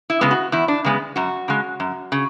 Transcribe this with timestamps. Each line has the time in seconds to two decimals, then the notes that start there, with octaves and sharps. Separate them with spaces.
0.10 E4
0.21 C#3 G#3 B3
0.31 F#4
0.52 E2 E4
0.68 D4
0.85 C#3 G#3 B3
1.16 F#2 F#4
1.48 C#3 G#3
1.80 F#2
2.12 C#3